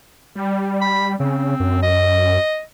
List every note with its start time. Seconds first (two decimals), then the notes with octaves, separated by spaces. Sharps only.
0.35 G3
0.82 B5
1.20 C#3 C4
1.60 F#2
1.83 D#5